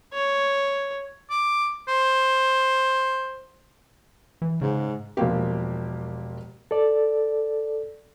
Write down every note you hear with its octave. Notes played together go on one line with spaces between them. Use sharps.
C#5
D6
C5
E3
G#2 C#3
E1 F3 A#3 G4
A4 D5